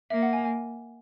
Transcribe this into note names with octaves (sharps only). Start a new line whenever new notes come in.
A#3 E5
F#5
G#5
G#5